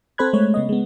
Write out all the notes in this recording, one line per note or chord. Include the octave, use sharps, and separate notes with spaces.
C4 A4 C5 B5 F#6 G#6
G#3 A3 C#5
C#3 B3 D#5
G#3 B3